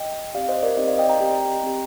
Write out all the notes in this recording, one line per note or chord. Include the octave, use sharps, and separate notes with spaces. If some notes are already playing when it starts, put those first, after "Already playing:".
Already playing: D#5 G5
C4 D#4 G4 D5 F5
C5 D#5
A#4 D5
C4 D#4 G4 C5 D#5
D5 F5
D#5 G5
G5 A#5
C4 G4
C4 G4